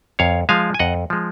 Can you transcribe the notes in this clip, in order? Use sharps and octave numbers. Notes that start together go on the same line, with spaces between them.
F2 C#5 F5
F3 G#3 F5 G#5
G#5
F2 D#5 F#5
F3 G#3